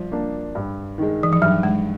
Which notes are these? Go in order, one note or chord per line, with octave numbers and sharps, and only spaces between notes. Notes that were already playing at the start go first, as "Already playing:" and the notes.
Already playing: F3 G3 D4
A#3 D4
G2
D#3 G#3
E3
F3
G2 F#3
G#3